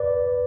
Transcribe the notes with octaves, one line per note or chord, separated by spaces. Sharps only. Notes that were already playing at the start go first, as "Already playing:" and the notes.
Already playing: B4 D5